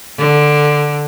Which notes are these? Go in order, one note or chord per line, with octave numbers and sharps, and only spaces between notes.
D3